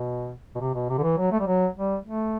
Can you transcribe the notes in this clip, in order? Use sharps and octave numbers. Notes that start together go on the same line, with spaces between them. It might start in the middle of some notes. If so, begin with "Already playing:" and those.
Already playing: B2
B2
C3
B2
C3
D3
E3
F#3
A3
G3
F#3
G3
A3